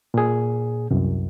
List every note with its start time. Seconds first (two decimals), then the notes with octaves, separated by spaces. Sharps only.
0.14 A#2 G#4
0.90 C2 F#2